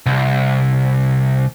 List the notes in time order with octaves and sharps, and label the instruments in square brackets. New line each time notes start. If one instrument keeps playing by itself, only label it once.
[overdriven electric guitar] C2